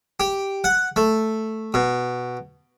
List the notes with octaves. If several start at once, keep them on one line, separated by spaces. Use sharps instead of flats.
G4
F#5
A3
B2